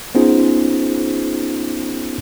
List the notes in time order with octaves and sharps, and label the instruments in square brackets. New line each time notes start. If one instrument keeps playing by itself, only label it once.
[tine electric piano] B3 C#4 D#4 F4 G#4 C5